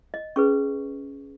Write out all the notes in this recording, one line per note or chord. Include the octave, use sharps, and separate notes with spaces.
D#5
C#4 G#4 B4 C#6